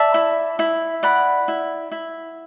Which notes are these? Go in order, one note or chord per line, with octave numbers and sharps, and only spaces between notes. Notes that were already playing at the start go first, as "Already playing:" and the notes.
Already playing: D5 E5 A5
E4
E4
D5 F#5 B5
E4
E4